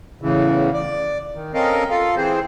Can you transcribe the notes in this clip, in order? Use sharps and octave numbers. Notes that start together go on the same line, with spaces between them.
E2 A2 C#3 E3
D5
D#3
C4 C#4 A4 A#4 D#5 F5
F4 A4 F5
E3 C4 G#4 C5